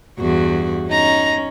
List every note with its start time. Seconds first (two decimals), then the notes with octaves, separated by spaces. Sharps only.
0.19 E2 G2 F#4
0.89 C#4 D#4 A#5